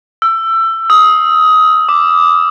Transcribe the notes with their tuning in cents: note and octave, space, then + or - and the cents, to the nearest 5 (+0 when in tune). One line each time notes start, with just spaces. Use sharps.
E6 +20
D#6 +20
D6 +0